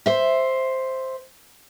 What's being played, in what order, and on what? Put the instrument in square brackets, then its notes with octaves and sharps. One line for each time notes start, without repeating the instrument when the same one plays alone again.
[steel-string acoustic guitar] C5 E5